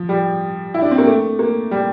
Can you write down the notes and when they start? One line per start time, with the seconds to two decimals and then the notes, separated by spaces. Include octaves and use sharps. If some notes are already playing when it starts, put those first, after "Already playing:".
Already playing: F3
0.09 G3
0.74 E4
0.82 D4
0.91 C4
0.98 A#3
1.07 A3
1.39 A#3
1.71 G3